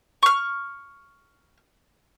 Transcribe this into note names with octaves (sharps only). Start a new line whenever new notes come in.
C#6 F6